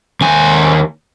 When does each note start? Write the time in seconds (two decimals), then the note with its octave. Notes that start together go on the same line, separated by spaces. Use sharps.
0.21 D#2 G#5